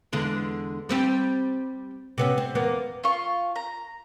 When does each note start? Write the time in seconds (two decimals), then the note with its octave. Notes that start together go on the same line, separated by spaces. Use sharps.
0.13 E2 D3 G#3
0.89 G3 C4 G4
2.18 C3 B3 C#4
2.38 C4
2.55 E2 A#3 B3
3.04 F4 C#6
3.56 A#5